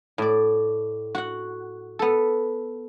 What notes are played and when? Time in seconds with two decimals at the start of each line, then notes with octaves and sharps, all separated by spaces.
0.18 A2 D5
1.15 F#4 F#5
1.99 B3 A4